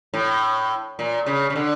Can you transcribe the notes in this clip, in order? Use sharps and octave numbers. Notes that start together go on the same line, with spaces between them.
A2
A#2
C#3
C#3
D3